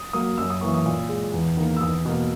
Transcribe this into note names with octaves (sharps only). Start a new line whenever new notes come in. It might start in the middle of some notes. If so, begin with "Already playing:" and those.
Already playing: D#6
F#3 A#3 D#6
F#2 E6
D#6
E3 A#3 C#6
D#6
A#2
G#3
E2
D#3 A#3
E6
E2 D#6
B2 A#3